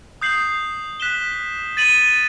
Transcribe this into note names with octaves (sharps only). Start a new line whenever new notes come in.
D#6 G6 C7 F#7
F#6 B6 E7 G7
A6 D#7 F#7